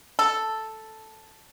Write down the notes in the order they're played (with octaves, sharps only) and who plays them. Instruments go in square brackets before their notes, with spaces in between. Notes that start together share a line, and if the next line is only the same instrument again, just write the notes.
[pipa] A4